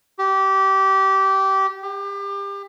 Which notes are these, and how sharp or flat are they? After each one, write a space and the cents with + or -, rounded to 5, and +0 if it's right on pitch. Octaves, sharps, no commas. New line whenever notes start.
G4 -20
G4 +30